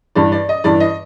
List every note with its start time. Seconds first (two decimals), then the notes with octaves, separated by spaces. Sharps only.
0.15 G2 E3 D5
0.32 D5
0.49 D#5
0.64 G2 E3 D5
0.80 D#5